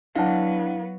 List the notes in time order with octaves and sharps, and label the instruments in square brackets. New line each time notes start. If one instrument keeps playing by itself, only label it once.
[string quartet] F#3 B3 [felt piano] D4 F#5 A5 [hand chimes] E4 F5